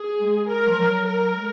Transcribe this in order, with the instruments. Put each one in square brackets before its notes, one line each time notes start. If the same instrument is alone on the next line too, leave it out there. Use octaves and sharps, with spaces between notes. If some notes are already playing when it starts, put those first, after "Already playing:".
Already playing: [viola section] G#4
[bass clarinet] G#3
[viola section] A#4
[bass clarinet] F3
F#3
[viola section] A#4
[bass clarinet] G#3